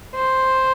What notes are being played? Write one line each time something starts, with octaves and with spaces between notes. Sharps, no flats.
C5